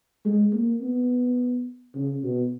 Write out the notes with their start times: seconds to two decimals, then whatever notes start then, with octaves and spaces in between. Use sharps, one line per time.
0.25 G#3
0.53 A#3
0.81 B3
1.95 C#3
2.23 B2